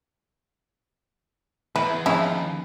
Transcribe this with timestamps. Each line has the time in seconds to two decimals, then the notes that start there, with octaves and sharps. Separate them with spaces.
1.76 E2 E4 B4
2.06 D#2 C#3 F3 E4 G#4